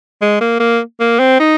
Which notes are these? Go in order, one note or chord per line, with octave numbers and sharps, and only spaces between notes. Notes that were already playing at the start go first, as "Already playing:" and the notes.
G#3
A#3
A#3
A#3
C4
D#4